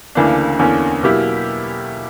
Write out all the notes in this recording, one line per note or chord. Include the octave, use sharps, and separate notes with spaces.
D2 C#3 E3 A#3 D4
E2 D3 A#3 C#4
B2 F#3 A#3 E4 G4